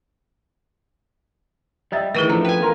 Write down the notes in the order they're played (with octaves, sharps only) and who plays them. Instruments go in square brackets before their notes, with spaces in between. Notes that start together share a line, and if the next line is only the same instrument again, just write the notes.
[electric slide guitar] G3 [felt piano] D#5 E5 A6
[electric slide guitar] D#3 [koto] E3 [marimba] A3 E4 G#4
[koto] D3 [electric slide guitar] F3 [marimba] C#4
[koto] B4 G#5 [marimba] G5
[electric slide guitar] E2 F4 [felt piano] A4 A#4